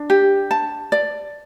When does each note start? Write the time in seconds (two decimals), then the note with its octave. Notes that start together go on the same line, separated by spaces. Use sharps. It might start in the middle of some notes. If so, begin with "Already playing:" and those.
Already playing: D4
0.10 G4
0.51 A5
0.92 D5